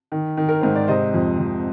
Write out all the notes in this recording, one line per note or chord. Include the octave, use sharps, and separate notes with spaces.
D#3
D#3
A#4
G#2 C5
D5
C3 C5 D#5
F2
F2